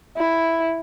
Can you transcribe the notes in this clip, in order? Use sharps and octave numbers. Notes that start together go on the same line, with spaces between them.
E4